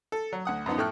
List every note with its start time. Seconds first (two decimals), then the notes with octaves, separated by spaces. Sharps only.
0.12 A4
0.33 F#3
0.45 D2 F#5 D#6
0.66 F#2 F3 B3 D#4
0.78 A2 A3 G5 C#6 F6 F#6